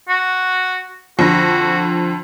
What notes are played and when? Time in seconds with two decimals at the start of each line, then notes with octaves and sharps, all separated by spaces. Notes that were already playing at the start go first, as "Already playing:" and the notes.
0.09 F#4
1.19 F2 D3 F#4 A#6